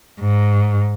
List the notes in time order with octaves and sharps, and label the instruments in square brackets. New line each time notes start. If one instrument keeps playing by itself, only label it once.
[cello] G#2